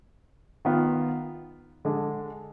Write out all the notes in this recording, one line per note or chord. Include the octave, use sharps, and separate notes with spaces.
D#3 B3 F4
D3 G#3 D4